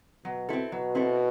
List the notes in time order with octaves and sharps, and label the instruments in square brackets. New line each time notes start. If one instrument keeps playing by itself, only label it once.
[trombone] B2 [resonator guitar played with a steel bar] F#3
[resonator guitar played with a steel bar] C4 E4 A4
[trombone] B2 [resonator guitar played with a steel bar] F#3
[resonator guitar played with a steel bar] C4 E4 A4